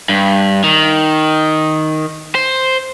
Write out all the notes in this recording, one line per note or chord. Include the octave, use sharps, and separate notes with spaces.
G2
D#3
C5